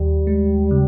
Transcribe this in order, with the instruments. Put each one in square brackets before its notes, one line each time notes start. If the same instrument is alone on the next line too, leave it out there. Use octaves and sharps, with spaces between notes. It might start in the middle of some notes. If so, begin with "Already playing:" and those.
Already playing: [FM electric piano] D#2 [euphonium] G3
[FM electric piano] G#3
C#3